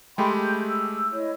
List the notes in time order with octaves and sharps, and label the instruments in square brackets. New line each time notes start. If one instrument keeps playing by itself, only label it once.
[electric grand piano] G#3 A3 G4 [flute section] G5 B5 C6
[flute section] G6
E6
E4 C#5 D#5